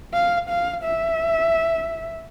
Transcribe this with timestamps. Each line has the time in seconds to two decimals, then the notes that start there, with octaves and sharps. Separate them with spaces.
0.13 F5
0.49 F5
0.84 E5